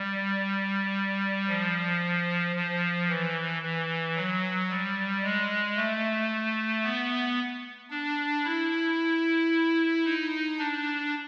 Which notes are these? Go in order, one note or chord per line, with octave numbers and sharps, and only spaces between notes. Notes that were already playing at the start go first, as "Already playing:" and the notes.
Already playing: G3
F3
F3
E3
E3
F#3
G3
G#3
A3
B3
D4
E4
D#4
D4